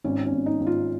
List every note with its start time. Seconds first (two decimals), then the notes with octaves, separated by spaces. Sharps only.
0.04 G#1 C#4
0.26 C#4
0.33 G#1
0.46 D#4
0.60 G#1
0.67 F4